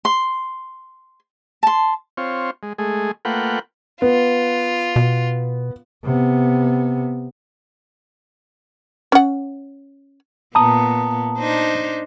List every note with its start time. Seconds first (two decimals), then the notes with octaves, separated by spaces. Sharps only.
0.05 C6
1.63 A5 C6
2.17 C4 F4 C#5
2.63 G#3
2.78 G#3 A3 G#4
3.25 A3 A#3 F4 B4 F#5 G5
4.02 B3 F4
4.96 B2
6.04 C3 B3
9.12 C#4 F#5
10.55 A#2 B3 A5 A#5 D#6
11.38 D4 D#4 C5